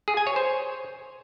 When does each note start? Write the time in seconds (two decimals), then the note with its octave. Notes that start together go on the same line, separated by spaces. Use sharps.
0.08 G#4
0.17 G#5
0.27 C#5
0.36 C5